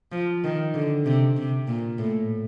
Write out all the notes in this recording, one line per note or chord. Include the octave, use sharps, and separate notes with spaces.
F3
D#3
D3
C3
C3
A#2
A2